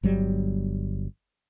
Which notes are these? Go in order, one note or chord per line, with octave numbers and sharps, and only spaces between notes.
G1 F#3 G3